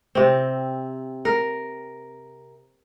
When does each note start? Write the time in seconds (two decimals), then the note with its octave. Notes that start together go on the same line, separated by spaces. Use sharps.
0.15 C3 C4
1.25 A#4